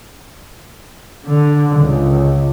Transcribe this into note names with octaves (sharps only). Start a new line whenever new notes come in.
D3
C#2